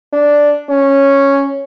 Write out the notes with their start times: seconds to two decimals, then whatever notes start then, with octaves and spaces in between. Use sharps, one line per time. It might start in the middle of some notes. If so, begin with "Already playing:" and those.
0.13 D4
0.70 C#4